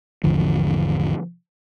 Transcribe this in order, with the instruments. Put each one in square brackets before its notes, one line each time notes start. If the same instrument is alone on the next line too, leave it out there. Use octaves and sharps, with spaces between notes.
[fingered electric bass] G#1 E2 D3 F3